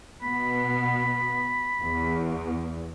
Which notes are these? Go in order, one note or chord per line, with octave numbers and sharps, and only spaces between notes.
B2 B3 B5
E2